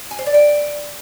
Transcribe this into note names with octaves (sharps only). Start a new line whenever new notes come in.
G#5
C5
D5
G5